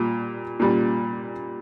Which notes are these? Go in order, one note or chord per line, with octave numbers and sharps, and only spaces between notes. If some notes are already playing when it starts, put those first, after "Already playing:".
Already playing: A#2 G3
A#2 G3